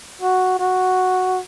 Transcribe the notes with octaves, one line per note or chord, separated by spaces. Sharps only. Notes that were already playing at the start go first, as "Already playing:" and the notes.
F#4
F#4